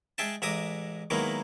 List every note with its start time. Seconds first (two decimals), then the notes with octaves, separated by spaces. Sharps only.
0.18 G#3 G#4 E5 G5 A5
0.42 A1 G#3 E5 A#5 D6 D#6
1.10 D#3 F#3 G#3 A#3 B3 E4